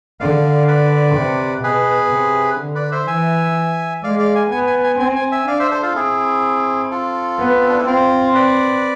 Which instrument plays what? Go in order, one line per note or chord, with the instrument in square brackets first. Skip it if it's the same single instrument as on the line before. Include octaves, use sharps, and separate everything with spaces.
[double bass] D3 [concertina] D5 F5
[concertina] B4 D5
[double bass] C3
[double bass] B2 [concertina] G#4 B4
[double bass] C3
D3
[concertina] B4 D5
C5 E5
[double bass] E3 [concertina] E5 G#5
[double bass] G#3 [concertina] D5 F5
[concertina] D5 F5
G#5
[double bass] B3 [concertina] G#5
[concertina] G#5
G#5
[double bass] C4 [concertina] G#5
[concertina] G#5
E5 G#5
[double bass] D4 [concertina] D5 F5
[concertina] C5 E5
A4 C5
F4 A4
[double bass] C4 [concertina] E4 G#4
[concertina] F4 A4
[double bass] B3
[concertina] C4
D4
E4
[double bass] C4 [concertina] F4
[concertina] B4 D5